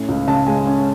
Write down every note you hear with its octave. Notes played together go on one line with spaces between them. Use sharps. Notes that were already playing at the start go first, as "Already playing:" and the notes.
Already playing: A2 C#4
C#2 F5
C#3 A5
G#3 G#5
C#4